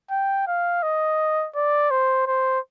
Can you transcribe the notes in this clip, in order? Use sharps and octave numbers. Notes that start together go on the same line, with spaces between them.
G5
F5
D#5
D5
C5
C5